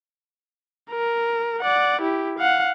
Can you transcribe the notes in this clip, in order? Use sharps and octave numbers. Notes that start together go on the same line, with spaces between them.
A#4
D5 F#5
E4 G4
F5 F#5